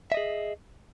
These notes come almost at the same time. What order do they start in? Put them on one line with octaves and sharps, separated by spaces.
E5 D#5 G#4